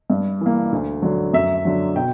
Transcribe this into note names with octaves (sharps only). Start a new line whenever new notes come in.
G2
E3 A#3
D2
D3 F#3
F#2 E5
D3 F#3
B2 G5